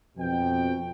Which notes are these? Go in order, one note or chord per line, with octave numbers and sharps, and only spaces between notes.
F2 B2 G5